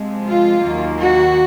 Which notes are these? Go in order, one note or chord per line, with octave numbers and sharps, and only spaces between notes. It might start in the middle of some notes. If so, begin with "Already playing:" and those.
Already playing: C3 F3 G#3
F4
D#2 D#3 F#3 A#3
F#4